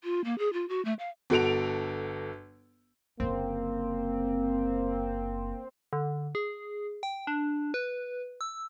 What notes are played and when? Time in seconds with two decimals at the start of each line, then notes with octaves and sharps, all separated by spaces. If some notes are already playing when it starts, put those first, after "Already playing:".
0.04 F4
0.24 A#3
0.38 G#4
0.53 F4
0.69 F#4
0.85 A3
0.99 F5
1.30 G1 F#4 A4 D7 F7
3.20 F#1 D3 A#3 C4
5.93 D3
6.35 G#4
7.03 G5
7.27 D4
7.74 B4
8.41 E6